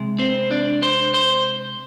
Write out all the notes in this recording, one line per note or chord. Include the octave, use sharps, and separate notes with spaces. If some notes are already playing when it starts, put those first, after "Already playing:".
Already playing: C3 G#3
C4 C5
D4 D5
C5 C6
C5 C6